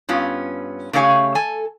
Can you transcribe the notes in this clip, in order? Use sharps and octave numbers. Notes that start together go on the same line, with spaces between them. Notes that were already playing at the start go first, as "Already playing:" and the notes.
G2 B3 C#4 F4
C#3 A3 G4 C#5 F5 G#5
A4 G#5